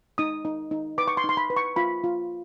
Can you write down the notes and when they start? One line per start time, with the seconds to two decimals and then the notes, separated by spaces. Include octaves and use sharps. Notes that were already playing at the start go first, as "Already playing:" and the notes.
0.18 D#4 D#6
0.45 D#4
0.71 D#4
0.98 B4 D6
1.08 C#6
1.17 C6
1.24 D#4
1.29 C6
1.37 B5
1.50 B4
1.57 C#6
1.76 F4 B5
2.04 F4